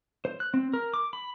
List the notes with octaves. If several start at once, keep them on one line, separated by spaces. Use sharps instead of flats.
C5
F#6
C4
A#4
D6
B5